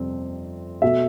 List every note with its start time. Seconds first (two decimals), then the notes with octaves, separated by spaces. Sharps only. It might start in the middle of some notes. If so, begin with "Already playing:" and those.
Already playing: F2 C3 G3 C4
0.82 B2 A3 E5